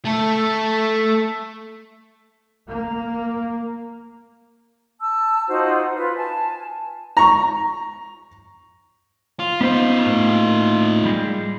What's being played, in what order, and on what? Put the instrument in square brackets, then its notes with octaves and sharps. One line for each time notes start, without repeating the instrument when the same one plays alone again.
[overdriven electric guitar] A3 A4
[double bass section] A#3
[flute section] A5 E6
D#4 F4 F#4 C5
F4 B4
G#5 A5
[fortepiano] A#5 C#6
[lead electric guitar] F4
[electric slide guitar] B3 C5 [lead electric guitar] D#4 F4
[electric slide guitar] A2 A#3
G3 G#3